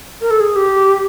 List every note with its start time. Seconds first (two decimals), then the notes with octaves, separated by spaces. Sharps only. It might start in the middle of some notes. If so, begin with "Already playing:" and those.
0.22 A#4
0.31 A4
0.40 G#4
0.56 G4